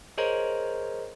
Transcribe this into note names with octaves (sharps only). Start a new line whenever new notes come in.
G#4 A#4 C5 C#5 D#5 A#5